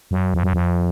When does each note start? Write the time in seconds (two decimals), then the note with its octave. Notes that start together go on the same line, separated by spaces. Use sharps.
0.11 F#2
0.34 F2
0.43 F#2
0.54 F2